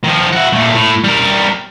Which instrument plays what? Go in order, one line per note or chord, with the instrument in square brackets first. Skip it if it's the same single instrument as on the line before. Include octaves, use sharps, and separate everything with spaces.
[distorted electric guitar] D#3 F3
E4 F#4
A#2 A3
A2
G3 A#4